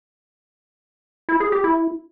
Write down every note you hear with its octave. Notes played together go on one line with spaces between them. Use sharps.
E4
G#4
G4
E4